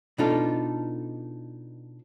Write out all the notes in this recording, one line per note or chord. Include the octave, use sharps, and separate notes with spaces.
B2 A3 D4 D#4 F4 A4